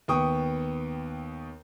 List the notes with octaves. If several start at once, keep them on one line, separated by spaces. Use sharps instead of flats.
D#2 B3 G5 C#6 D#6